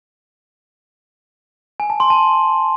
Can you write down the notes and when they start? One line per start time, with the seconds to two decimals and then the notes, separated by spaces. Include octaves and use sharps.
1.80 G#5
1.90 A5
2.00 C6
2.10 A5